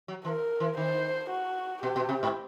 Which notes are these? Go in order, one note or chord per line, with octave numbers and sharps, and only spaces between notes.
F#3
E3 A#4
E3
D#3 C5
F#4
B2 G4
B2
C3
G#2